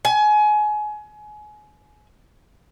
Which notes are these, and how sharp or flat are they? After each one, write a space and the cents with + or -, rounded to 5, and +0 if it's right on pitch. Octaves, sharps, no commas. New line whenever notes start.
G#5 +25